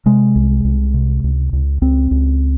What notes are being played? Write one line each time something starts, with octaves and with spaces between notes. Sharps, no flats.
C3 G#3
C2
C2
C3
C#2
C#2
C#2 C4
C#2